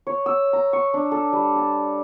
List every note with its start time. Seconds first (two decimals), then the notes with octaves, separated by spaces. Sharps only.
0.07 C#5
0.26 E6
0.53 A#5
0.73 C#6
0.94 D4
1.12 A4
1.33 G3
1.56 A5